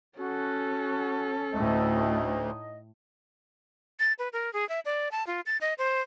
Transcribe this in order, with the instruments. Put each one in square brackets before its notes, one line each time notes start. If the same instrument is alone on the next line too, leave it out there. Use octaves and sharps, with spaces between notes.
[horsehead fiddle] C#4 A4 [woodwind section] F#4
[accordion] D2 [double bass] A2 A3 [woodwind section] D#4 C#5 D#5
[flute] A6
B4
A#4
G#4
E5
D5
A5
F4
A6
D#5
C5